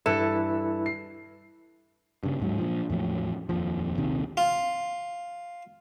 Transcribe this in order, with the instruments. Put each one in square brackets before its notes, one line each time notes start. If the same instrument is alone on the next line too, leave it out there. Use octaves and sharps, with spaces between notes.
[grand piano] G2 [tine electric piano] E4 B4 [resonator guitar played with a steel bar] A4
[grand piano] C7
[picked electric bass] G2 C#3
D1 G#2 F#3
A#2 F3
E2 A2 F3 F#3
D#1 F2 A#2 F3
A#1 D#2 C3 D#3
[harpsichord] F4